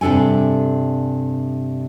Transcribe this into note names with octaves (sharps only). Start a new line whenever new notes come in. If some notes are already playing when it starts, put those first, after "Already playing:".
G2 C3 D4 A4 G#5